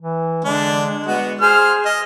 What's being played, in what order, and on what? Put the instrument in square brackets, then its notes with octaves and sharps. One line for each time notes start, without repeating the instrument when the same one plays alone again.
[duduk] E3
[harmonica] D3 D4 [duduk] G#3
[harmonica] B3 F#4
[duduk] G#4 [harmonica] C5 F6
[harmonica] D#5